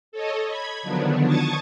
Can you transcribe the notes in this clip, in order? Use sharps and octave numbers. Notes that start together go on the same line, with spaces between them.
A4 C#5 D#5
B5 G#6
D3 D#3 F3 F#3 B3 D4
A5 C#6 D#6 G#6 A6